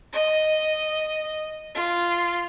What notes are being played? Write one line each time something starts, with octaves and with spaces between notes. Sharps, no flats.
D#5
F4